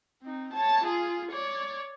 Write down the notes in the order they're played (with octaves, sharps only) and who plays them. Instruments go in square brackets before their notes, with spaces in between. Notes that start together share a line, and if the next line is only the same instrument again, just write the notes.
[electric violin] C4 D#4
C#5 A5
F4 G#4
C#5 D5